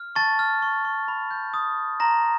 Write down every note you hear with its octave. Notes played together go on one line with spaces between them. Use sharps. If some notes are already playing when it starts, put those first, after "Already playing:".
Already playing: F6
A5 C#6 A6
F6
C#6
C#6
B5
G6
D#6
G6
A#5 C6 A#6
F6